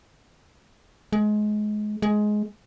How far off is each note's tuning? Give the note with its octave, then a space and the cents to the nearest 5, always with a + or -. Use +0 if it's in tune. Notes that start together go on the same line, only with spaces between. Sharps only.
G#3 +25
G#3 +15